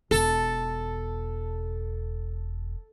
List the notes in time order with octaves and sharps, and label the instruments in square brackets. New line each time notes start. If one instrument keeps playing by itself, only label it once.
[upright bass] E1 [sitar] A4